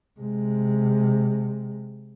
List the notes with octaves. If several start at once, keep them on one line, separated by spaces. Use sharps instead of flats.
C3 G#3